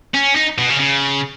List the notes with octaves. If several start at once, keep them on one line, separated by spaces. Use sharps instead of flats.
C#4
D#4
B2
C#3
C#3